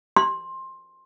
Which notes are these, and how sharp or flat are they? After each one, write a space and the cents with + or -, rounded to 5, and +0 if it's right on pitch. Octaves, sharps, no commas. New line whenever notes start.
C6 +15